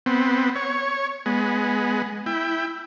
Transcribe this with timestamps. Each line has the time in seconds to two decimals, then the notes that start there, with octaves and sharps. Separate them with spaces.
0.06 B3 C4
0.55 C#5
1.26 G#3 B3
2.26 E4 G5